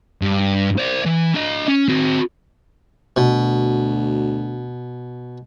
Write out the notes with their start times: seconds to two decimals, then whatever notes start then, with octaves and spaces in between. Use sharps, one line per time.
0.22 G2
0.78 C5 D5
1.05 E3
1.34 D4 D#5
1.68 C#4
1.88 C4 F#4
3.16 D2 B2